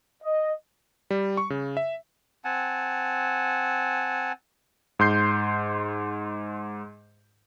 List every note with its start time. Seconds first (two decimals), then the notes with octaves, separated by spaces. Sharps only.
0.23 D#5
1.11 G3
1.37 C#6
1.50 C#3
1.77 E5
2.45 C4 F#5 G#5 A5
4.99 G#2 C6 G6 C7